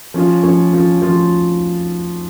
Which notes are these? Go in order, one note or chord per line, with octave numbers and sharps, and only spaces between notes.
F3 C#4 F4
F3 C#4 F4
F3 C#4 F4
F3 C#4 F4